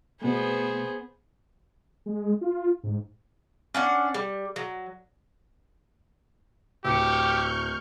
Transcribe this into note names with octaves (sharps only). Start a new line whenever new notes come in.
B2 A3 B3 G#4 C5
G#3
F4
G#2
C#4 D4 F#5
G3
F#3
D1 G4 C#6 E6 F6 G6 C#7